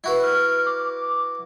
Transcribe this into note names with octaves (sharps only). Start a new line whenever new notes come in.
E4 F#4 B4
F6
D6